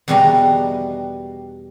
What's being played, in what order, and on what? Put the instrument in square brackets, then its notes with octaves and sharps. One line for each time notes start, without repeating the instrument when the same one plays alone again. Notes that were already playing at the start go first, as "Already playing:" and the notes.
[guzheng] E2 B2 G3 D4 D#5 A#5